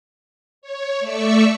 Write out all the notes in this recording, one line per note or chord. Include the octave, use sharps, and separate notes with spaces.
C#5
A3 D5 E5 C#6 E6